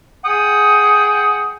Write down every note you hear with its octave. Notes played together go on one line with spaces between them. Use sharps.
G#4 F#5 G5 D#6